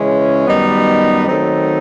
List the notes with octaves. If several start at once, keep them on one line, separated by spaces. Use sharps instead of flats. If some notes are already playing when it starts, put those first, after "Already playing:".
Already playing: C#3 E3 G#3 C#4
F#2 D#3 G3 B3 D#4
D#3 F#3 A3 C4 D#4